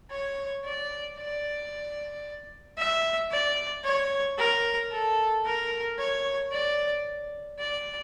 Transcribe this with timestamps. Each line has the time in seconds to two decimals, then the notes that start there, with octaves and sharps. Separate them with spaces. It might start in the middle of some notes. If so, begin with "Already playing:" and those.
0.11 C#5
0.64 D5
1.18 D5
2.78 E5
3.31 D5
3.84 C#5
4.38 A#4
4.92 A4
5.45 A#4
5.98 C#5
6.52 D5
7.59 D5